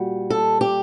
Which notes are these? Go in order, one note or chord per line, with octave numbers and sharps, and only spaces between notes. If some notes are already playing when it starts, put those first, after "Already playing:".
Already playing: A#2 G3 F#4
A4
G4